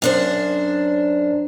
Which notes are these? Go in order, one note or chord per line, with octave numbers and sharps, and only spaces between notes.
F#2 D4 C5